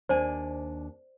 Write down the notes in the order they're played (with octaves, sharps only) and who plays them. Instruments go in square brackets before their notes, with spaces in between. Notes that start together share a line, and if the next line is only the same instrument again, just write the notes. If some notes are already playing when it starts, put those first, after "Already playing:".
[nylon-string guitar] D#2 D4 G#5 [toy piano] C5 D5